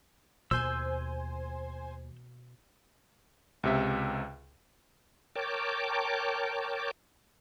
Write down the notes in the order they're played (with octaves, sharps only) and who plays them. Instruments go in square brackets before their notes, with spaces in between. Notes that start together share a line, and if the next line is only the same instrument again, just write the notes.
[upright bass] D#2 [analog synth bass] B2 [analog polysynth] C5 G#5 [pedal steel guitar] E6 G6
[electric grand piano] C#2 C3 E5
[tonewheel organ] A#4 C#5 G5 A5 D6